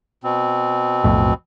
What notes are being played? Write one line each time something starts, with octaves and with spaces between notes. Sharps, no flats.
B2 C4
B1 F2 A2